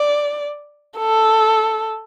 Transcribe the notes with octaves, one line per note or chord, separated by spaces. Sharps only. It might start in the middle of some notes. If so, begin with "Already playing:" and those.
Already playing: D5
A4